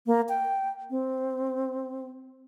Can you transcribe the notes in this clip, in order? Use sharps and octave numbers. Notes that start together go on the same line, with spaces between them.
A#3
G5
C4